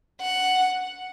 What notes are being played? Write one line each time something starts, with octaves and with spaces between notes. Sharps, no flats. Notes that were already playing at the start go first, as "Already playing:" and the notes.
F#5